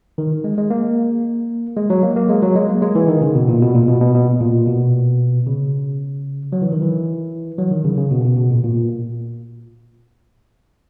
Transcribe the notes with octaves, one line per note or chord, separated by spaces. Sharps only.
D#3
G#3
G#3
A#3
G#3
F#3
A#3
A#3
G#3
F#3
G#3
A#3
G#3
E3
D#3
C#3
B2
A#2
B2
A#2
B2
B2
B2
A#2
B2
C#3
F#3
E3
D#3
E3
F#3
D#3
C#3
C#3
B2
B2
B2
A#2
A#2